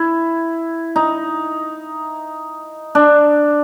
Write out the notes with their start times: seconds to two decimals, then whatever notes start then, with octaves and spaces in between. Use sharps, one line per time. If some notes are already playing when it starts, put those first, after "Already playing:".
Already playing: E4
0.96 D#4
2.95 D4